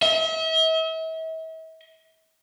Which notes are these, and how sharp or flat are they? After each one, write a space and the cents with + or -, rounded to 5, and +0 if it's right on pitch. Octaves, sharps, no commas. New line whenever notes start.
E5 -40